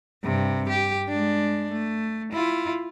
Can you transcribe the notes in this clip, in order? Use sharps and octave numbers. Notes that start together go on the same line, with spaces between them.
G2 C3
G4
G#3 D4
A3
E4 F4